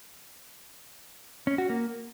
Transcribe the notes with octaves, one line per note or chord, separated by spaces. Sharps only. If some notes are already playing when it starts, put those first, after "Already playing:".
C#4
F#4
A#3